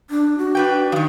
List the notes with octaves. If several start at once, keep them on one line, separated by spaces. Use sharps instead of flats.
D4
F#4
D4 B4 G5
D#3 F3